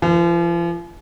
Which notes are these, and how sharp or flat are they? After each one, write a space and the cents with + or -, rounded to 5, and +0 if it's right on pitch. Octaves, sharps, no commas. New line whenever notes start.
F3 -40 A#4 +20